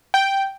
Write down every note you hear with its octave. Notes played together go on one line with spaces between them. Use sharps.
G5